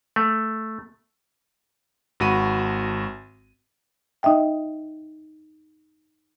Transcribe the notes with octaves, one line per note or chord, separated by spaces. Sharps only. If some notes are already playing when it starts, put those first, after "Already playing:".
A3
G#1 F#4 B5 D#7
D#4 D#5 E5 G5